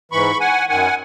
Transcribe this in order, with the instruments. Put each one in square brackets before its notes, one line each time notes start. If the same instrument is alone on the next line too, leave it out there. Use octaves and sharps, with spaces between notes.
[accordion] G#2 E3 B5 C#6
F#5 G#5
F#2 D#3 F#5 G#5